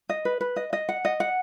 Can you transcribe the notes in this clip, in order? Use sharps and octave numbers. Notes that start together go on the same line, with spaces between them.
D#5
B4
B4
D#5
D#5
F#5
D#5
F#5